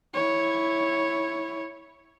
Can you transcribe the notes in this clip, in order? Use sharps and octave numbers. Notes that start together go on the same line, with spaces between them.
E4 C#5